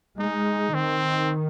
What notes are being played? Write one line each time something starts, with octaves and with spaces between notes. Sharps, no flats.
G#3 D#4
D#3 C4